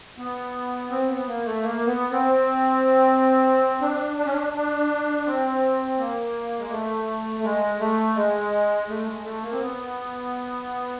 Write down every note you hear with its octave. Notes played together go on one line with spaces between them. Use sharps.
B3
C4
B3
A#3
A3
A#3
B3
C4
D4
D4
C#4
D4
D4
C4
A#3
G#3
A3
G#3
A3
G#3
A3
G#3
A3
A#3
C4
B3